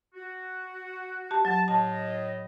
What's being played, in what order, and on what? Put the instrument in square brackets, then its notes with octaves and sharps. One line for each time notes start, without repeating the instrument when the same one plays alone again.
[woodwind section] F#4
[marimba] G4 A5
[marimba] F#3 [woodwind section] A5
[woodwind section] A2 D#5 [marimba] A5